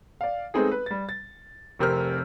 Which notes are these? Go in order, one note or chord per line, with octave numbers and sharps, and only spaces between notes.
D5 F5
G#3 A3 B3 C4 D#4 G#4
B4
G3 A6
A6
F1 C3 C4 G4 A#4 F6